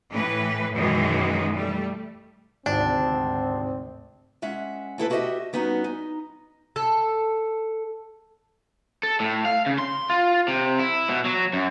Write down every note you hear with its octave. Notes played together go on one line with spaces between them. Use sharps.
A2 E3 B4
F#2 B2 D#3 E3 F#3 G#3
G3 A3
G#1 D2 G#2 C3 C4 D4
G#3 C#4 E5 F#5
A3 E4 A4 B4
E4 F#4 G4 C5 D#5 E5
G3 B3 C#4 D#4 F#4
D#4
A4
A4
A2
F5
C#3
C6
F4
C3
E4
B2
F#3
F#2